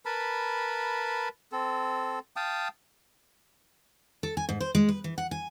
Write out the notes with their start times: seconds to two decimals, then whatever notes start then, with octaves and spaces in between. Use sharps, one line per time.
0.05 A#4 B4 A5 B5
1.52 C4 A4
2.36 F5 G5 A5 D#6
4.23 A4
4.37 G#5
4.49 G#2
4.60 C5
4.75 G#3
4.89 B4
5.04 E3
5.18 F#5
5.31 G#5